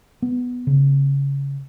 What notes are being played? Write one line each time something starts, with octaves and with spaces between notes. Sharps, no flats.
B3
C#3